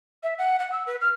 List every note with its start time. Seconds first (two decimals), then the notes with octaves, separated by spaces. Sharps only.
0.23 E5
0.38 F#5
0.59 F#5
0.72 E6
0.86 B4
1.01 F6